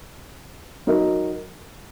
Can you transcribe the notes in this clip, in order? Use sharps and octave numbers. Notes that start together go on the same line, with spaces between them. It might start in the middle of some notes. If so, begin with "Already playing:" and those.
F#3 D#4 A#4 D#5